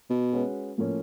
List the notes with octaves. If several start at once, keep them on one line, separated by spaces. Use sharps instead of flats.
B2
G#3 C#4 F#4 B4
A2 F3 A#3 C#4